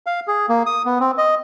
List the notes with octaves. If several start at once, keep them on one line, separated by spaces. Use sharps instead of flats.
F5
G#4
A#3
D#6
B3
C4
D#5